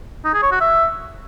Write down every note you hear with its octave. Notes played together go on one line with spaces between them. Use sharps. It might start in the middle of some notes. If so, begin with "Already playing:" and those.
D#4
G#4
C#5
F#4
E5